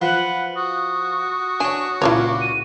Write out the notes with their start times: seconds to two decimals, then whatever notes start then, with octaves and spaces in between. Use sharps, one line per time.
0.02 F3 B4 F#5
0.56 F#4 D#6
1.60 D4 C#5 G#5
2.02 C#2 A#2 E4 F4 C#5 D6
2.41 D#7